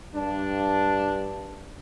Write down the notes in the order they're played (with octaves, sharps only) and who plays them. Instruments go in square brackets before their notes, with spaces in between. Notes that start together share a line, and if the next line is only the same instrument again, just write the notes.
[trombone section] G2 D4